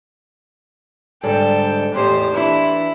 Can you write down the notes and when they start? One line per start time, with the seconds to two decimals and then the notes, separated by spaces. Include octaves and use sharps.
1.23 G#2 D3 G3 A4 G5
1.95 E2 A2 D#4 G4 C5
2.35 E3 D4 E4